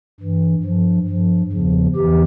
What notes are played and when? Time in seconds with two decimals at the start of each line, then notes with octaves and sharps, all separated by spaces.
0.20 G2 E3
0.63 G2 F3
1.07 G2 F3
1.52 E2 C#3 F3
1.95 E2 E3 G4